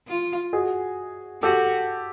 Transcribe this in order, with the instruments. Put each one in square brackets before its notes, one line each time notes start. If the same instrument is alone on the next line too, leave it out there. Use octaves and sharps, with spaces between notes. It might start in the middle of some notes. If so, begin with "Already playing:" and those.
[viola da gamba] F4
[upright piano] F#4 G#4
[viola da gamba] F#4 [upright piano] G4 A4